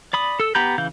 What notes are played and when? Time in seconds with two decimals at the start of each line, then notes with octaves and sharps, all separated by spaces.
0.13 D5 B5 D#6
0.40 A4 E6
0.55 B3 G4 A#5 B5 G6
0.78 C#3 E3 F5 G6